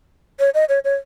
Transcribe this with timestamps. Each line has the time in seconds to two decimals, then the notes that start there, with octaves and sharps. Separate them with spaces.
0.40 C#5
0.54 D#5
0.69 C#5
0.84 C#5